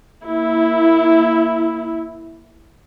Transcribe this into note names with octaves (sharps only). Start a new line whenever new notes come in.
A#3 E4